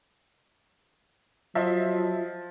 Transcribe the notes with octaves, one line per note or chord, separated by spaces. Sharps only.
F3 F#3 F4 D#5 E5